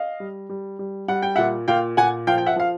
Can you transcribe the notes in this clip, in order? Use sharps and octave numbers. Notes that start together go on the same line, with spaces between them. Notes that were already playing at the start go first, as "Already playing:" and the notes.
Already playing: D#5 F5
G3
G3
G3
G3 F#5
G5
A#2 E5 F#5
A#2 F5 G5
A#2 F#5 G#5
F3 F5 G5
G5
E5 F#5
F3 F5